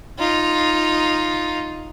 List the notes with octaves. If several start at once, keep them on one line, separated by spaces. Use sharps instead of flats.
D#4 F4